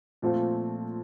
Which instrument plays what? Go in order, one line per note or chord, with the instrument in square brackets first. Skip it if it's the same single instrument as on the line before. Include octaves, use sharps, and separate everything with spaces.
[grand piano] A#2 F3 A3 C4 F4